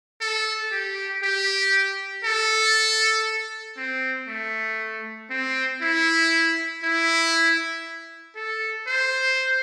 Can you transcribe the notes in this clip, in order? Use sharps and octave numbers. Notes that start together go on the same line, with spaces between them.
A4
G4
G4
A4
C4
A3
C4
E4
E4
A4
C5